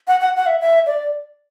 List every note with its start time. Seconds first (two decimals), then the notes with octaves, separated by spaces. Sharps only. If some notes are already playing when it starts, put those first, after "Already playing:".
0.08 F#5
0.20 F#5
0.36 F#5
0.46 E5
0.61 E5
0.86 D5